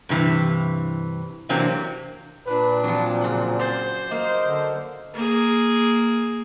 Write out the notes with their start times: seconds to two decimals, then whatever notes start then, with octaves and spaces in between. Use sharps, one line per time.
0.09 G2 C3 E3
1.49 C3 E3 F#3 A#3 C4 D4
2.47 A#2 D4 B4
2.84 F3 F#3 C4
3.21 C#3 F#5
3.59 C5 D5
4.11 A#3 D#5
4.44 D3
5.14 A#3 G#4